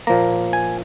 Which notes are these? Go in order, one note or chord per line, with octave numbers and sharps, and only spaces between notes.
A#2 F3 A#3 A#5
G#5